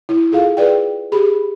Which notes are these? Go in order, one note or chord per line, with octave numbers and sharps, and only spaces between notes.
E4
F4 G#4 A4 F5
G#4 B4 D5 G5
G4 G#4 B5